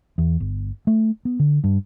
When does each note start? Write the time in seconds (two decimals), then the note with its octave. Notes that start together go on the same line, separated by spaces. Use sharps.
0.18 E2
0.40 G1
0.87 A3
1.25 B3
1.40 D3
1.64 G2